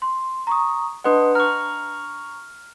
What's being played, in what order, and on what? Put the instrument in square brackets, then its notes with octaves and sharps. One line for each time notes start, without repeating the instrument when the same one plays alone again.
[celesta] C6
A#5 C#6 D#6
[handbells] D4 B4 F#5 [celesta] D#5 C6 D#6
[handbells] A#5 C#6 [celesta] F6